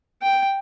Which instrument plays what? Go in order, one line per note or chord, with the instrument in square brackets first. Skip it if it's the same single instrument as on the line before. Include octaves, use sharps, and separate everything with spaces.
[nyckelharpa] G5